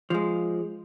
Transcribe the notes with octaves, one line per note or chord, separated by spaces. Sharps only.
F3 G#3